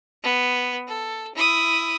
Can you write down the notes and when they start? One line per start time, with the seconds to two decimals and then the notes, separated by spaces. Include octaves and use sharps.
0.23 B3
0.88 A4
1.35 E4 D#6